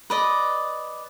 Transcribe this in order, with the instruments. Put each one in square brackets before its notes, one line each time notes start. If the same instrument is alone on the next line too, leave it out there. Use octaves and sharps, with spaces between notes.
[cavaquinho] B4 D5 D#5